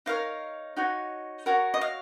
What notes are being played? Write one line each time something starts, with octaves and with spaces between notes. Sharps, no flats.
D#4 A#4 C#5 F5
D#4 F#4 C#5
F#4 A#4 C#5
D#5
F5